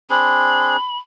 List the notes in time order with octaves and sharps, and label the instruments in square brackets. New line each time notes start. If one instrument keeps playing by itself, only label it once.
[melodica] C4 D4 G#4 [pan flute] B5